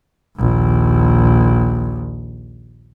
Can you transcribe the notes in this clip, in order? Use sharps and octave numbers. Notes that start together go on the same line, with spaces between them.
A#1 D#2